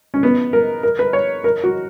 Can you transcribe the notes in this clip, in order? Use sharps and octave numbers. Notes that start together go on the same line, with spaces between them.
C#4
B3
A#4
A#4
B4
C#5
A#4
F#4